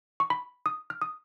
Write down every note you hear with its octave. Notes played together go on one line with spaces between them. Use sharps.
C#6
B5
D#6
F6
D#6